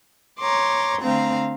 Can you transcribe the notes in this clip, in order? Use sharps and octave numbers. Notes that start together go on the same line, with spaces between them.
C#5 A#5 C6 D6
D3 A3 C4 F5 A#5